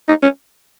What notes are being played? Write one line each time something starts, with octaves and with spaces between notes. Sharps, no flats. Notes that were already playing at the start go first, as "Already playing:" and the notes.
D#4
C#4